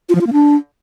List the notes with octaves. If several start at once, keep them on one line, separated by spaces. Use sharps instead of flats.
F4
F3
F4
A#3
D4